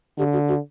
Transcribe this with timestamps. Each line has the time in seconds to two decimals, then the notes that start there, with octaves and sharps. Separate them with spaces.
0.18 D3 G4
0.33 F#4
0.49 F#4